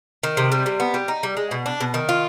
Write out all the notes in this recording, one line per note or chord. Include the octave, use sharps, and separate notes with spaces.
D#3
C3
G3
C3
B3
G3
D#4
G3
G#3
B2
D4
B2
D#3
F4